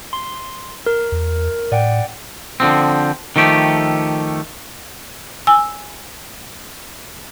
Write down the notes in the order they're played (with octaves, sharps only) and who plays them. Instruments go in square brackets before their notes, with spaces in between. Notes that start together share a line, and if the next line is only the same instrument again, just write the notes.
[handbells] C6
A#4
[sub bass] E2
[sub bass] A2 [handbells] D5 F#5 G5
[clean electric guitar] D3 F3 C4
D#3 F3 A3 G4
[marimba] G#5 E6